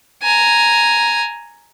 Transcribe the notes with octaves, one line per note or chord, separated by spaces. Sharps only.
G#5 A#5